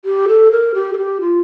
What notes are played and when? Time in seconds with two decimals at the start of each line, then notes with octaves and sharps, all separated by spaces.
0.05 G4
0.28 A4
0.52 A#4
0.74 G4
0.93 A4
0.98 G4
1.21 F4